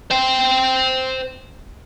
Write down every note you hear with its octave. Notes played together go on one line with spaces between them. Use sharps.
C5 G5